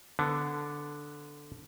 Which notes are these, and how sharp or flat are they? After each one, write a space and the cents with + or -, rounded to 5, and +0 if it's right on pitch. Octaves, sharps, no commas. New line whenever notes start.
D3 +0 B3 +20